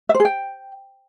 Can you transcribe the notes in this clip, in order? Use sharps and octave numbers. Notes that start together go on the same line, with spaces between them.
E5
C5
G#4
G5